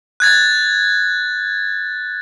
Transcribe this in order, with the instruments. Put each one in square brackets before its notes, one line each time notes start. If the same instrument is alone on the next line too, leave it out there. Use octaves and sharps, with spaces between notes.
[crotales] F#6 G#6 A6